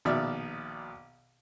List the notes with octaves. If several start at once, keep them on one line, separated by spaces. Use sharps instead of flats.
A#1 B2 D#3 D5 E5 F6